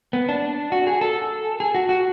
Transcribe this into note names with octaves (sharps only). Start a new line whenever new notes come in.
B3
D4
F#4
G#4
A4
G#4
F#4
F#4